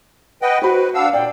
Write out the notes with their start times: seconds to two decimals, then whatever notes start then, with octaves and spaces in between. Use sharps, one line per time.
0.42 B4 D#5 F#5 G5
0.62 F#4 B4 C5 B5
0.94 D4 F5 F#5 E6
1.13 A#2 D5 G5